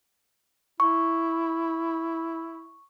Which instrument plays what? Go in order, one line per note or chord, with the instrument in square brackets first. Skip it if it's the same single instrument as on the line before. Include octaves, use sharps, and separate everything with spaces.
[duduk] E4 [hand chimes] C#6